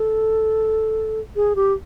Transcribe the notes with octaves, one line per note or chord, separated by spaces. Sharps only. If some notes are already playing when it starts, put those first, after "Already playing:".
Already playing: A4
G#4
G4